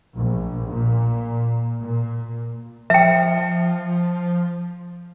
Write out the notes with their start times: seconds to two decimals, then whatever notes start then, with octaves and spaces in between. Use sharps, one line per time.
0.16 A#1
0.72 A#2
1.79 A#2
2.90 F3 E5 G5